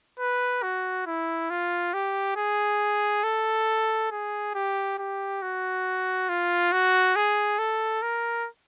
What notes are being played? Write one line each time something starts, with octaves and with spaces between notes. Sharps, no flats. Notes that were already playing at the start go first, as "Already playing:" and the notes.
B4
F#4
E4
F4
G4
G#4
A4
G#4
G4
G4
F#4
F4
F#4
G#4
A4
A#4